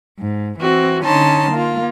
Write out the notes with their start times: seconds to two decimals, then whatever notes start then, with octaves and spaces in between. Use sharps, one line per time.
0.18 G#2
0.59 E3 C4 F#4
1.03 D3 C#4 D#4 A5 C6
1.51 A#3 F4